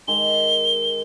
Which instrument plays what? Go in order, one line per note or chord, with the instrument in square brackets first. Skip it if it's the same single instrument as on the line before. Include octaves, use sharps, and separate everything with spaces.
[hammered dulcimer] D#3 G#3 [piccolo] G7